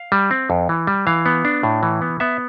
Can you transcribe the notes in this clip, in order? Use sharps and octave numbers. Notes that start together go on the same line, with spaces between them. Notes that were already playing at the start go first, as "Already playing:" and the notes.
Already playing: F5
G3
C4
F2
E3
G3
E3 F5
B3
D4
A2
E3
B3
B3 E5